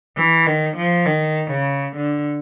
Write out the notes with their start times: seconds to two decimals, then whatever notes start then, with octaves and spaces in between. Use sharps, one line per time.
0.16 E3
0.46 D#3
0.77 F3
1.06 D#3
1.51 C#3
1.96 D3